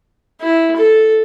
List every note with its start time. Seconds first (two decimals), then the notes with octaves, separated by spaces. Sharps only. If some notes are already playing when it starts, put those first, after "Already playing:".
0.41 E4
0.77 A4